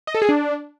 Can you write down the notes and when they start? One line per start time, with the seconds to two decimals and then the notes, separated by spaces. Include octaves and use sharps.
0.07 D#5
0.15 A4
0.22 G#4
0.29 D4